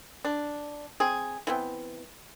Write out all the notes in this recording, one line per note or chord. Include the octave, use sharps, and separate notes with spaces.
D4
C4 G#4
E3 B3 C4